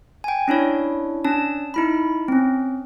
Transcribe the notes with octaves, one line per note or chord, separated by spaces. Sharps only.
G5 G#5
C#4 D4 E4 C#5
C#4 D4 A5
D#4 E4 B5
C4 C#4